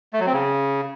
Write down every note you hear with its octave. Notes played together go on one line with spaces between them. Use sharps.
A3
F#3
C4
C#3